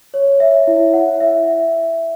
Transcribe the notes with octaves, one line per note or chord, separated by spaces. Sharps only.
C#5
E5
E4
F#5
E5